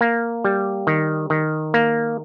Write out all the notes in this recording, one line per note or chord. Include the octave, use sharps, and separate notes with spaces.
A#3
G3
D#3
D#3
A#3